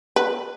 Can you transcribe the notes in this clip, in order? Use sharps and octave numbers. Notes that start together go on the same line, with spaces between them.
B4